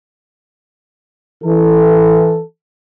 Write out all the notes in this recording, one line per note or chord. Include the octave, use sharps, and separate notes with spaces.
E3 A4